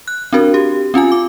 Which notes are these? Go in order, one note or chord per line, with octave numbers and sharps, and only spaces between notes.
F#6
C4 D4 F#4 A#4
G4
C4 C#4 F4 G#5
D6